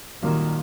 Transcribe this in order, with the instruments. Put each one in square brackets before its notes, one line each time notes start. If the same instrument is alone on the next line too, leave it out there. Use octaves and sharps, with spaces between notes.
[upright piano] C2 A#2 F#3 A#3 [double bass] D#3